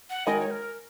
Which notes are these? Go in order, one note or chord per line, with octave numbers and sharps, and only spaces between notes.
F#5
D#3 G#3 F#4 A#4 D#5
C#5
A#4